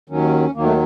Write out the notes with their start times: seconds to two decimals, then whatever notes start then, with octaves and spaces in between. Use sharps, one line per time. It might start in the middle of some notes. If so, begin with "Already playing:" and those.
0.09 D#2 D#3 F#3 C#4
0.54 D#2 D#3 F#3 A#3
0.63 A3